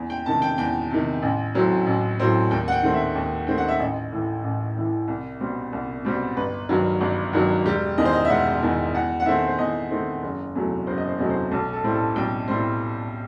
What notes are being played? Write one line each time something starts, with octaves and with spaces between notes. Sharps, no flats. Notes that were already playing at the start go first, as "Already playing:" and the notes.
Already playing: E2
G5
C3 D#3 A5
G5
E2 G5
C3 D#3
A1
A2 F#3 C4
A1
A2 F#3 C4
D#2 G5
F#5
G5
D#3 A3 C4
E5
D#2
D#3 A3 C4 G5
F#5
E5
A1 D#5
A2 E3
A1
A2 E3
C2
B2 G3 C4
C2
B2 G3 C4
G1 B4
G2 D#3 F#3
G1
G2 D#3 F#3
E1 G4
E2 D#3 D#5
C5
D#5
E5
E1 F#5
E2 D#3
E2 F#5
F#5
D#3 A3 C4 E5
C5
E2 D#5
D#3 A3 C4
F#1
E2 C3 F#3 A3
F#1 C5
D#5
C5
E2 C3 F#3 A3 D#5
C5
B1 A4
A4
A2 G3 C4
A4
B1 G5
A2 G3 C4